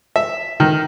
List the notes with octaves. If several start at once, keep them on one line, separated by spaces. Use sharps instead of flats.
E5
D#3